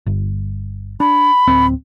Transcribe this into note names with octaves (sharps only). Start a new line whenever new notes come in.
G1
D4 B5
D1 C4